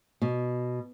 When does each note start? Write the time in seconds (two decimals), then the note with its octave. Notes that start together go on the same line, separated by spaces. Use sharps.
0.22 B2